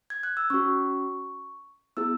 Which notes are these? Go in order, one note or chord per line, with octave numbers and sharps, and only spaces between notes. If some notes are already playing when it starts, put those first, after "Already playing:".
G#6
F#6
E6
C#4 F#4 C#6
B3 E4 G#4 E6